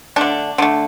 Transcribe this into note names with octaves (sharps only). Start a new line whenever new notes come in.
D3 A3 D4
D3 A3